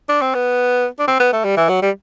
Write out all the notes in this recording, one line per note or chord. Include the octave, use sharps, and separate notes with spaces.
D4
C4
B3
D4
C4
B3
A3
G3
E3
F#3
G3